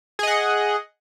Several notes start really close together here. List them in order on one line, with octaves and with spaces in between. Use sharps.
G#4 D#5 F#5